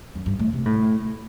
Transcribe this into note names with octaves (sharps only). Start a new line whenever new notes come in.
F#2
G2
A2
C3
A2